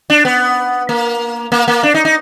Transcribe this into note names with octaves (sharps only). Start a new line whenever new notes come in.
D4
B3
A#3
A#3
A#3
D4
D#4
D#4